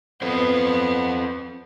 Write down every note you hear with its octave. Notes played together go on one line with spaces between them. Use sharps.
B3 C4 A4 C5